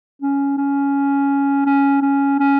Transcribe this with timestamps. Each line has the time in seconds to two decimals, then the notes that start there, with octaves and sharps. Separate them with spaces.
0.22 C#4
0.58 C#4
1.66 C#4
2.02 C#4
2.39 C#4